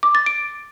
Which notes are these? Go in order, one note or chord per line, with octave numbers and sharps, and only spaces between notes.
D6
A6
D7